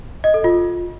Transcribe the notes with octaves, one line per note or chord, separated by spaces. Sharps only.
D#5
A4
F4